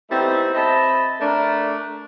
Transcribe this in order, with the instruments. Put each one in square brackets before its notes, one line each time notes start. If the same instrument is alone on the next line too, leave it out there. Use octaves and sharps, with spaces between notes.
[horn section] G3 A3 B3 C4 D#4 E4
C4 D#5 E5 A5 B5
A3 D4 A#4